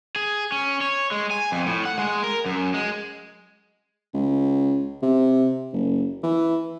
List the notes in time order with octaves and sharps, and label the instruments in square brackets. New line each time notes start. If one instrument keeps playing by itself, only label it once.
[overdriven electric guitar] G#4
C#4
C#5
G#3
G#5
F2
A2
F#5
G#3
A#4
F#2
G#3
[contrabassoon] C#2
C3
F#1
E3